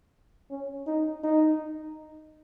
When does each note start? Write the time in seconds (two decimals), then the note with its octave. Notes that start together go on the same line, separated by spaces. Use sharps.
0.51 C#4
0.87 D#4
1.24 D#4